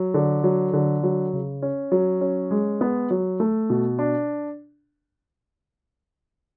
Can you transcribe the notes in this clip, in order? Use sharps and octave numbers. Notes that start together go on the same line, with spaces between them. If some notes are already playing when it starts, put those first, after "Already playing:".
Already playing: F#3
D3
F#3
D3
F#3
C#3
C#4
F#3
C#4
G#3
B3
F#3
A3
B2
D4